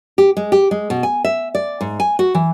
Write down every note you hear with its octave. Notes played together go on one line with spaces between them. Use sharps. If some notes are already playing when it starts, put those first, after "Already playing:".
G4
G#3
G4
G#3
B2
G#5
E5
D5
G#2
G#5
F#4
E3